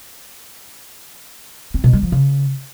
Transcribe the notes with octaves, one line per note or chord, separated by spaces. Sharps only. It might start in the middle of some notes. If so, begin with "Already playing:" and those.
C4
B2
G3
F3
C#3